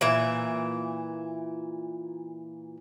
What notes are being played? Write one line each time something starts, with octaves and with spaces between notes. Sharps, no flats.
A#2 E3 E5